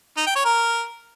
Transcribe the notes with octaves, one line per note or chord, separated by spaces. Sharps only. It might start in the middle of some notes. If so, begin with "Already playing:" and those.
D#4
G5
C#5
A#4